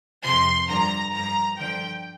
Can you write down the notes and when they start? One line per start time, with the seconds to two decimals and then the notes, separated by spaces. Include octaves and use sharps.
0.23 F2 C3 F3 C6
0.68 G2 D3 F3 A#5
1.13 G2 F3 A#5
1.58 G2 D3 F3 G5